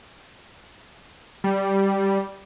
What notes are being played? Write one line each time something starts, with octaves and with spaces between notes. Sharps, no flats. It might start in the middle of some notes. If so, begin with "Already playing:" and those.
G3